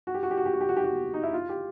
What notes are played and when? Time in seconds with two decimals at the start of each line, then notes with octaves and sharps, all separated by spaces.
0.07 F#4
0.14 G4
0.23 F#4
0.31 G4
0.37 F#4
0.46 G4
0.53 F#4
0.61 G4
0.69 F#4
0.76 G4
0.84 F#4
1.14 D#4
1.23 E4
1.33 F4
1.49 G4